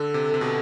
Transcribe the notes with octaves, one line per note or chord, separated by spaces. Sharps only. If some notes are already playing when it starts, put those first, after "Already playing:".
Already playing: D3 A4
C3
C3
B2